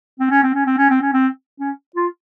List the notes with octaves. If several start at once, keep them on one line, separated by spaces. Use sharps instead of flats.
C4
C#4
C4
C#4
C4
C#4
C4
C#4
C4
C#4
F4